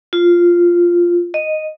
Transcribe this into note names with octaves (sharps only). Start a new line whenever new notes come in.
F4
D#5